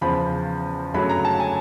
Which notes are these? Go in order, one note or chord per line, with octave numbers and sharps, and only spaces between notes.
E2 C#3 F3 B5
G1 F#2 C#3 F#3 A3 B5
A#5
A5
G#5